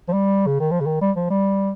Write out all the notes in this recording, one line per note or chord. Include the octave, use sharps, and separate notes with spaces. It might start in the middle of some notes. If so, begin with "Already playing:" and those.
F3
G3
C#3
D#3
F3
C#3
D#3
G3
F3
G3